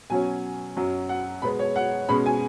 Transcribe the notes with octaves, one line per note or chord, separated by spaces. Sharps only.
B2 F#3 C#4 G#5
F#2 F#3 C#4
F#5
B2 G#3 B3 B5
C#5
F#5
B2 G#3 C#4 B5
G#5